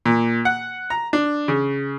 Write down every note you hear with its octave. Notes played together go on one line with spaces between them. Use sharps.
A#2
F#5
A#5
D4
C#3